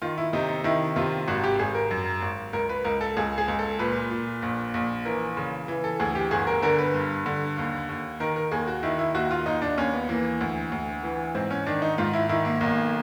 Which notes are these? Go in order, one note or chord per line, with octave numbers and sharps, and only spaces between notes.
D#3 F4
E4
C3 D#4
D#4
D#3 E4
C3 F4
G#1 F#4
G4
G#1 G#4
A#4
F#2
G#1
C#2 A#4
B4
C#2 A#4
A4
C#2 G#4
G#4
C#2
A4
A#2 B4
A#2
A#1
A#1
E3 A#4
C#3
E3
A4
D2 G#4
G4
G1 G#4
A#4
D3 A#4
B4
G2
D3
D#2
D#2
D#3 A#4
A#4
D#2 G#4
F#4
D#3 E4
E4
D#2 F#4
F4
D#2 D#4
D4
D#2 C#4
B3
E3 A#3
D2
D2
E3
G#2 C4
C#4
D#3 D4
D#4
G#2 F4
E4
D#3 E4
A#3
B1 A#3